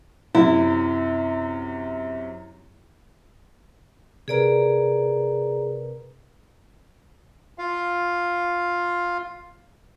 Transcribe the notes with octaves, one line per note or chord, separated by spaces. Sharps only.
F#2 C3 E4
C3 G#4 A#4 B4 D5 A#5
F4 F5